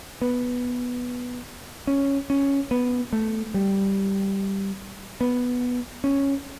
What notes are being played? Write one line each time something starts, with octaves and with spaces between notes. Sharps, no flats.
B3
C#4
C#4
B3
A3
G3
B3
C#4